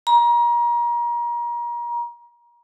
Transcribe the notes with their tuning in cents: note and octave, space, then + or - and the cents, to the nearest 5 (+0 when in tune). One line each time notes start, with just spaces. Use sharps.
A#5 +30